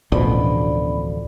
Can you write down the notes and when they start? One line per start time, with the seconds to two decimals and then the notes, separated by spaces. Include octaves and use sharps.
0.12 E1 A1 D2 B2 D3 F3 D5 B5